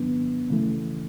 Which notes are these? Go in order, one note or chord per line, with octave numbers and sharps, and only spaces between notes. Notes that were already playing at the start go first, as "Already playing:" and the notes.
Already playing: G#2 D#3 F#3 B3 D4
C#3 E3 A3